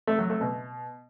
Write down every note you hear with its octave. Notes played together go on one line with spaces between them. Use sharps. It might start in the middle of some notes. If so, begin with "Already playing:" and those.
A3
F#3
A3
B2